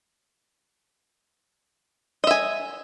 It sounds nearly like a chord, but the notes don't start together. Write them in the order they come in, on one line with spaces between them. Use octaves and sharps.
D#5 E5 G#5